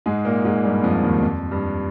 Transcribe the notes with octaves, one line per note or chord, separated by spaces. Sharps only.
G#2 G#3
A#2 A#3
G#2 G#3
G2 G3
F2 F3
D#2 D#3
F2
G2